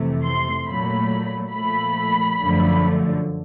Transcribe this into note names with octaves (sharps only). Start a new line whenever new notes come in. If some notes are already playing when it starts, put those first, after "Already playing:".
Already playing: F2 C3 E3 A3
C6
A#2 F#3 A3 B5
A#2 F3 A3 B5
F#2 D3 F3 A3